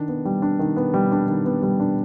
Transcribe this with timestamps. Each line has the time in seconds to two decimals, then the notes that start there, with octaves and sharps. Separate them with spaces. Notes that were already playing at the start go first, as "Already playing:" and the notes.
Already playing: D#3 D4
0.08 B3
0.25 G3
0.42 D4
0.59 D#3
0.76 B3
0.94 G3
1.12 D4
1.28 D#3
1.45 B3
1.63 G3
1.80 D4